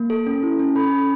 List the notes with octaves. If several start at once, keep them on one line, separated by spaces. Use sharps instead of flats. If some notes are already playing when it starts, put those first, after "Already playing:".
Already playing: A#3
A4
C#4
E4
C#4
A4 B5
C#4